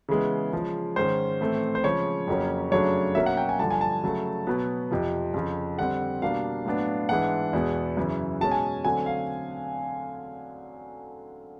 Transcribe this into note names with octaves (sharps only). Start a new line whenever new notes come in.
C#3 E3 G#3 B3
C#3 F3 G#3
G#2 D#3 G#3 C#4 C5
A2 E3 A3 C4
C5
C#3 F3 G#3 C#5
F2 C#3 F#3 A#3 C#4
F#2 C#3 F#3 A3 D4 C#5
B2 F#3 A#3 C#4 E5
F#5
G5
G#5
G2 D3 F3 A5
G#5
A5
C#3 F#3 A3
B2 F#3 B3
F2 C3 F3
F2 C#3 F3
D3 G3 C4 F#5
B2 G3 A#3 D4 F5
A2 F#3 B3 D4
G#2 E3 G#3 B3 D4 F#5
E2 B2 G#3 B3
F#2 C#3 E3
B2 G#3 C#4 A5
G#5
D3 F#3 A3 C4 G#5
F5